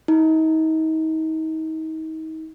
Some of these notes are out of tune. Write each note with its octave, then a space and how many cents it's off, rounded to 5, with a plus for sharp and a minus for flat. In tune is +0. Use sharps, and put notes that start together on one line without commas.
D#4 +35